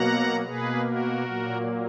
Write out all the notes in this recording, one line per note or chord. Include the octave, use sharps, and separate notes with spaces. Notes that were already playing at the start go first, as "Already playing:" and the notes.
Already playing: B2 F#3 A#3 F#5 A#5
B2 A#3 G#4 B4
F#4 A#4
A#2 F#3 A#3